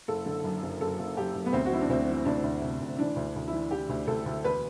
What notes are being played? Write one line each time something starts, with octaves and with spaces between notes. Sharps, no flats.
F#1 A4
D3
F#2
F#1
F#1 A4
F#1
F#2 G4
F#2
B3
D2 C4
F#4
E3 E4
D4
D2 C4
E3
D2 D4
D2
C3
D2
E3 D4
D2
D2
E3 E4
E3 G4
D2
D2 A4
D2
E1 B4